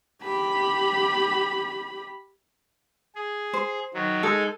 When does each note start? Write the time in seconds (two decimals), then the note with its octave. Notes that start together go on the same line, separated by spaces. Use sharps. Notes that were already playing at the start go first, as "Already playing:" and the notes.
0.23 G4 B5
3.15 G#4
3.53 C5
3.94 D#3 F#3
4.23 G#3 D#4 A4 G#5